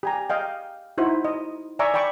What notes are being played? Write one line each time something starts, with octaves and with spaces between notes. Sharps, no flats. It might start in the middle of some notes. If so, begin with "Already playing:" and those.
G4 G#5 A#5
D#5 F5 G5
D#4 E4 F#4 C5
D#5
D5 E5 G#5 A#5 C#6 D6
D5 G5 B5 C#6 D6